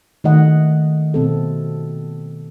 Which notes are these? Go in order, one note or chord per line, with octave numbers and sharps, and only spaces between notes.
D#3 A3 D#5 F#5
B2 C4 A4